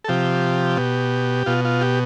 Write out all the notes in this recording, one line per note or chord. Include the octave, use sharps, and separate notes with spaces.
A4
C3 F3 G4
B2
B2 F4
F4
G4